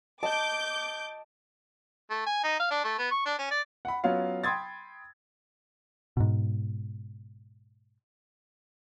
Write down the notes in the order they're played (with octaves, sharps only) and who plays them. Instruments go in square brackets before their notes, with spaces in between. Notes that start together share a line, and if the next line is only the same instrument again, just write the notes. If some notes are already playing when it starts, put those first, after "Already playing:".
[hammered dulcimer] D#5 [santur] A5 [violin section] D6 G6
[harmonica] A3
G#5
D#4
F5
D4
A3
B3
C#6
D4
C#4
D5
[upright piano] F#5 B5
F#3 B3 C#4 F4 F5
G5 B5 C6 D#6 G#6 A6
[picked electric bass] G#2 B2